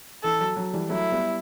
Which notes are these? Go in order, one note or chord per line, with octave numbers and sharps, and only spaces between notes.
E3 A4
F#3
F#3
E3 G3
F#3 A3 E4
G3 B3